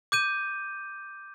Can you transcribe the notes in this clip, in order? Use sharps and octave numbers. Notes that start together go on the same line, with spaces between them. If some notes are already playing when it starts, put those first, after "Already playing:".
D6 G6 D#7